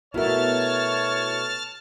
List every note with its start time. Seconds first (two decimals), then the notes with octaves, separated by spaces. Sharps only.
0.14 B2 A3 E4 F#4 A#4 C#5 A5 F6